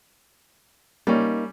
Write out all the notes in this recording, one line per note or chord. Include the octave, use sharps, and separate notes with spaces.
G3 A#3 C#4 D#4